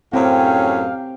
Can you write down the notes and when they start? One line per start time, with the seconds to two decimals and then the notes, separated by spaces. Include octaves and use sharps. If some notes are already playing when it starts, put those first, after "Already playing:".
0.13 F#2 A2 C4 C#4 G4 F5 G5